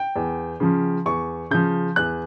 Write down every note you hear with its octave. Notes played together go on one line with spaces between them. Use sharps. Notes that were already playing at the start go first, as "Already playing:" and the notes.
Already playing: G5
E2
C#3 F3
E2 C#6
C#3 F3 G6
E2 F#6